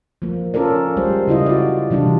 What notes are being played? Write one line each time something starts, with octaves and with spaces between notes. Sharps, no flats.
F3 A#3
C#4 F4 A4 A#4 D5
G3 G#3 G4 C5
C#3 E4 F4 D#5
F#4 D5
C3 E3 G3 D4 F4